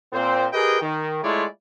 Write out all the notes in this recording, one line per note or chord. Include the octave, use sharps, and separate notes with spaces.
A#2 C4 C5
G4 G#4 A#4 B4 D#5 G5
D#3
G#3 A3 E4 F4 C#5 D5